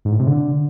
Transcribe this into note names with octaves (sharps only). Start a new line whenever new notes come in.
G#2
A2
C3
D3